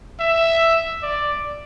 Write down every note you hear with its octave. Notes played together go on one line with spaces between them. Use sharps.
E5
D5